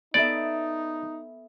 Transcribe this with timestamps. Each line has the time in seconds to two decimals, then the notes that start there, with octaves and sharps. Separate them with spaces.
0.14 B3 D#4 A4 D5 E5